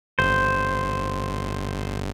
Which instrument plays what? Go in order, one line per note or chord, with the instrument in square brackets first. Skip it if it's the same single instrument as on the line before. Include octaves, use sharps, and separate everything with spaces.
[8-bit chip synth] G1 [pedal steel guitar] C5